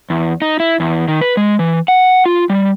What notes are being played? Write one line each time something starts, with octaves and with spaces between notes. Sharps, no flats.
E2
D#4
E4
E2
D#3
B4
G#3
E3
F#5
F4
G3